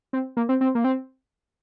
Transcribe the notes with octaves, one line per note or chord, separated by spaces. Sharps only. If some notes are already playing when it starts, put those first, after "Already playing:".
C4
A#3
C4
C4
A#3
C4